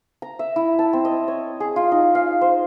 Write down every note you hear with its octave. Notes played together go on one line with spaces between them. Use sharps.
A#5
E5
E4
A5
C4
D#5
C#5
G#4
F4
D#4
F5
C5